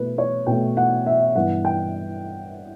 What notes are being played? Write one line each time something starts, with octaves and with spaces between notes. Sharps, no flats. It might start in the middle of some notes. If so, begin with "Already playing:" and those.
Already playing: B2 A3 B4
C#5
B2 A3 G5
F#5
E5
G2 E3 B3 F#5
G5